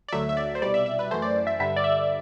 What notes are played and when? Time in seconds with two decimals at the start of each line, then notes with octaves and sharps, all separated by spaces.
0.09 D5
0.13 D2 D3 F#3 A3 E5
0.29 E5
0.37 D5
0.55 C5
0.62 C2 B2 G3 D5
0.74 E5
0.86 E5
0.99 B4
1.11 F#2 E3 A3 C5
1.22 D5
1.47 E5
1.59 G2 D3 G3 E5
1.76 D5
1.84 E5